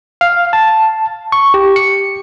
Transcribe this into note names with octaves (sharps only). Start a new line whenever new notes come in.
F5
A5
C#6
G4
C#7